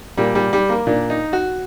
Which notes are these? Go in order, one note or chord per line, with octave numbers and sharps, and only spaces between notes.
A#2 G3
G3
G3
A#3
A#2 D4
D#4
F#4